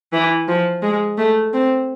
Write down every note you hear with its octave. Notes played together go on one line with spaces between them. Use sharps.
E3
F3
G#3
A3
C4